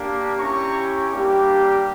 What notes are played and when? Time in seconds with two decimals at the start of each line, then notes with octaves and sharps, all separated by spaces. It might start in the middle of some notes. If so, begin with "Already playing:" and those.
Already playing: A#3 D4 G4
0.38 C#4 E4 G4 A#5 C#6
1.12 G3 A#3 D4 G4